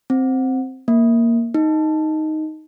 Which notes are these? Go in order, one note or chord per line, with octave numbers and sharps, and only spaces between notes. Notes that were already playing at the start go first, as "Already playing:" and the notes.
C4
A#3
D#4